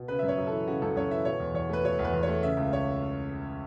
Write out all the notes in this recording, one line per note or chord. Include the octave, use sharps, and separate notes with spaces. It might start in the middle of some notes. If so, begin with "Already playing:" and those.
Already playing: B2
C#3 B4
E5
F#2
C#5
F#2
E3 A4
C#3 F#4
F#2 A4
F#2 C#5
E3 E5
B2 C#5
E2
E2 C#5
A3 B4
B2 C#5
E2
B4
E2
A3 C#5
C#3 E5
C#2
C#5